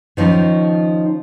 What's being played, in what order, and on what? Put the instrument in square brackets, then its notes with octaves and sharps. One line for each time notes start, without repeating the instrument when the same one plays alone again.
[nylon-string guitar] D#3 F3 C#4 D#4